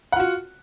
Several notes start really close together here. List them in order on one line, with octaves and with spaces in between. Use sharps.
F#5 F4 F#4